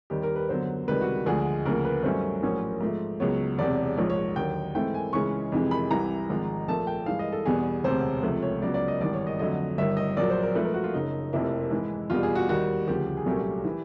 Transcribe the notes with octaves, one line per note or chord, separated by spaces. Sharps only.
D#2 D#3 G3 G4
A#4
B4
F#2 D3 F#3 B3 C5
C#2 C3 D#3 G3 B4
F#4
D2 D3 F3 G#3 G#4
D2 C#3 F3 A#3 A#4
B4
G2 D#3 F#3 A3 C#4 C5
A#1 A2 F#3 A#3 C#4
G#2 F3 A3
C#2 C#3 F#3 B3 C#5
E1 E2 C3 D5
A#1 G#2 F3 C#5
C#5
D#2 D3 F#3 G5
G#2 E3 A3 C4 G5
G#5
C#2 C#3 E3 G#3 C#4 C#6
F2 C3 E3 G#3
B5
C2 C3 E3 A#5
G#1 G#2 F3 G#3
A#1 A#2 F3 A3 A5
G5
G2 E3 G#3 F5
D#5
A4
E2 B2 G3 B3 G#4
E1 D2 C3 C5
C#2 C3 F3 A3
C#5
C#2 C#3 F#3 B3 D5
D5
D#5
G#1 G2 E3 D5
C#5
D#5
F2 D3 F#3 A3 D#5
G1 G2 D#3 E5
D#5
A#1 A#2 F#3 D5
C5
A#4
G#2 F3 A3 B4
A#4
F#4
F4
F#1 F#2 C#3 D#4
F1 F2 C3 F3 A#3 E4
G#2 E3 G#3
E2 B2 G3 F4
G#4
F#4
D#2 D#3 G3 F#4
D2 C#3 F3 G4
G4
G#4
C2 A#2 F#3 A3 C#4 G4
E3